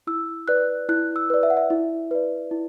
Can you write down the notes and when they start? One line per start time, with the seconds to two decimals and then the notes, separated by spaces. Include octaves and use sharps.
0.07 E4 E6
0.48 B4 D5 F#6
0.89 E4 F#6
1.16 E6
1.30 B4 D5
1.43 E5
1.50 F#5
1.57 E5
1.70 E4
2.11 B4 D5
2.51 E4